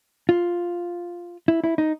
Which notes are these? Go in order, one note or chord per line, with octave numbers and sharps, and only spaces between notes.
F4
E4
E4
D#4